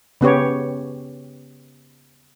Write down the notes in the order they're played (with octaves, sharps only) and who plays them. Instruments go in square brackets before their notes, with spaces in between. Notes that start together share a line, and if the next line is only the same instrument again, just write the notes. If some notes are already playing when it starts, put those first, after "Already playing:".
[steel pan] C#3 B3 G4 C#5